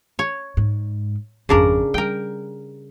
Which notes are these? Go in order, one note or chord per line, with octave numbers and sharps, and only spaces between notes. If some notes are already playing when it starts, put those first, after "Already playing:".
C#5
G#2
G#1 F2 C#3 D4 A#4
G3 A#4 G5